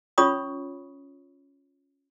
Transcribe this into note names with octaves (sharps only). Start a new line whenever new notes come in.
C#4 F4 C#5 B5 C#6 D#6